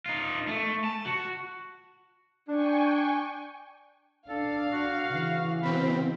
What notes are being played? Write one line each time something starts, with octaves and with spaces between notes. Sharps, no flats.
D#4 F4
A3
A5
F#4
D4 G5 G#5 C#6
D4 A4 F5
F#4
C#3 E3
B2 C4 B5